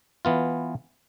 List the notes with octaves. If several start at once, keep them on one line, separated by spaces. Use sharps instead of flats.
E3 B3 F4